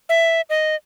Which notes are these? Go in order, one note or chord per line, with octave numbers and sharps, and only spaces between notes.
E5
D#5